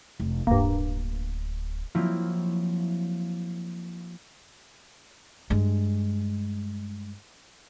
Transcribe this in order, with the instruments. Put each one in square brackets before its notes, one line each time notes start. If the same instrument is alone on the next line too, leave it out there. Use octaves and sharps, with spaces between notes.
[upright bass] F1
[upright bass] D1 [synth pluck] G2 A#3
[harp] F3 F#3 A#3 C4 E4 F4
[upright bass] G2 G#3